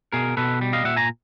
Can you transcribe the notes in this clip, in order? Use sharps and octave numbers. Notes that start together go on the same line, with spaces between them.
B2 G#4 A#4
B2 A4 B4
G3
D#5 F5
A#2 E5 F#5
G#5 A#5